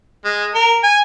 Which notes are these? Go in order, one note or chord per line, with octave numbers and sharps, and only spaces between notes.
G#3
A#4
G#5